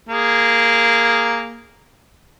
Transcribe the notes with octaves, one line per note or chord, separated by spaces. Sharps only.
A#3 G#4